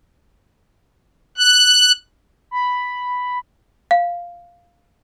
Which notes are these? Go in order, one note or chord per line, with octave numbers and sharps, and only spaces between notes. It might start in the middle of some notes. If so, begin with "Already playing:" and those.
F#6
B5
F5